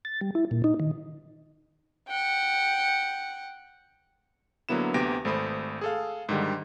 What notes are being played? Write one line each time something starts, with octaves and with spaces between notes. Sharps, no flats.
A6
G3
E4
A#2
D#4
D#3
F#5 G5
D3 F#3 A#3 B3 E4 E7
D2 C3 B3 G4 A#6 D7
G#1 A3 C5 B5 D#6
G#4 A4 F5
G#2 D3 D#3 G3